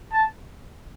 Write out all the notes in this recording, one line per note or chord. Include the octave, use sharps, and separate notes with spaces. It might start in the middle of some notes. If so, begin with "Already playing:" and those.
A5